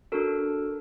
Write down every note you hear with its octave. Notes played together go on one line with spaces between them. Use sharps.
D4 F#4 A4 A#4